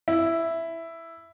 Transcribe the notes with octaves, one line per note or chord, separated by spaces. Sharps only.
E4